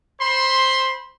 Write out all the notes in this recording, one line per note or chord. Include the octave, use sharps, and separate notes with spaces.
C5 B5 C6